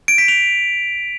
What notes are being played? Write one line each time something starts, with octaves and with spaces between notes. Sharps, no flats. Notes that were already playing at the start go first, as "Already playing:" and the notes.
D7
B6
F7